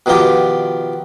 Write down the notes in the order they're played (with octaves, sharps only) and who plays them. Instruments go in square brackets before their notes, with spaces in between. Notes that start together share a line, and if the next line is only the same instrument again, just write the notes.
[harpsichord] B2 D#3 F3 F4 G4